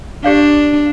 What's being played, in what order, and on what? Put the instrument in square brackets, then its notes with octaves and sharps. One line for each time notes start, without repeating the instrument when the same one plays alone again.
[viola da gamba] D4 [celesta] G4 D5 F5